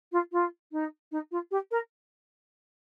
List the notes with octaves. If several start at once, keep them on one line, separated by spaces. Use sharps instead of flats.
F4
F4
D#4
D#4
F4
G4
A#4